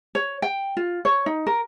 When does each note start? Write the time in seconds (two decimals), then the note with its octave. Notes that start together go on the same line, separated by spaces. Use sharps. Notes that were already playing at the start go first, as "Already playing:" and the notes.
0.15 C#5
0.42 G5
0.77 F4
1.05 C#5
1.26 D#4
1.47 A#4